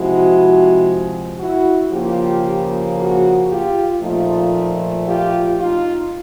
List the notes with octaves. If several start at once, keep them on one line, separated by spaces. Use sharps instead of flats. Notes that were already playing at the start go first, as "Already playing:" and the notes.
Already playing: C3 F3 G#3 E4 F#4
E4 F#4
C#3 F3 A#3 F4 G4
F#4 G#4
F4 G4
A#2 F3 A3 D#4 F4
F4 G4
D#4 F4